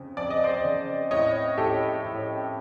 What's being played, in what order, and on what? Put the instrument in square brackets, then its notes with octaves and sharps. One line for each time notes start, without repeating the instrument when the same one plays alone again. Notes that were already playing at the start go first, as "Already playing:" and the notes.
Already playing: [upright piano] F2 C#3
F2 D5
D#5
C5 D5
C#3
A2 C#5 D#5
A2 G4 A4
A2